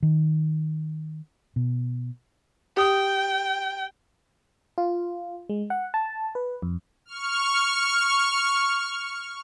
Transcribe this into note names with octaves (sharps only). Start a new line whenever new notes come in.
D#3
B2
G4 G5 D#6
F4
G#3
F#5
A5
B4
F2
C#6 F6